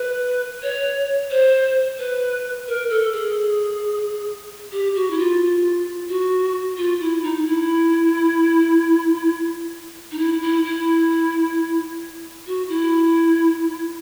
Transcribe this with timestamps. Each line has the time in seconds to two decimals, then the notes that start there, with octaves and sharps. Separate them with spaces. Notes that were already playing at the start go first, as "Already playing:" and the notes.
Already playing: B4
0.63 C#5
1.31 C5
1.99 B4
2.68 A#4
2.90 A4
3.13 G#4
4.72 G4
4.95 F#4
5.10 E4
5.18 F4
6.09 F#4
6.77 F4
7.00 E4
7.23 D#4
7.46 E4
10.11 D#4
10.19 E4
10.42 E4
10.65 E4
12.47 F#4
12.69 E4